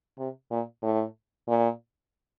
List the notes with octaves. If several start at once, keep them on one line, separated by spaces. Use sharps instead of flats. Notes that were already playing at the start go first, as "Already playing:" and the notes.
C3
A#2
A2
A#2